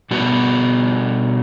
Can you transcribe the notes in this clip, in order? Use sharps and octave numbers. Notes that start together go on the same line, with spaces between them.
B2 G3 B3 F#4